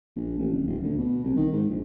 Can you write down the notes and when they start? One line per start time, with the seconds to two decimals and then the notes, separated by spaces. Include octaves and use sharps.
0.16 A#1
0.39 A1
0.52 D1
0.67 D#1
0.83 D2
0.98 B2
1.24 C2
1.37 D#3
1.53 G#2
1.70 A#1